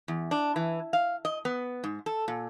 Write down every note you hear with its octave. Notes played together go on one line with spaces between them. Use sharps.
E2
D4
E3
F5
D#5
B3
G#2
A4
A#2